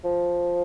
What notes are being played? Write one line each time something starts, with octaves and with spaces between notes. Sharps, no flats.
F3